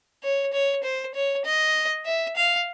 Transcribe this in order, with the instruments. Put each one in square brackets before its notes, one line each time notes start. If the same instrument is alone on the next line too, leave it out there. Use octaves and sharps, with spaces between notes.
[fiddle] C#5
C#5
C5
C#5
D#5
E5
F5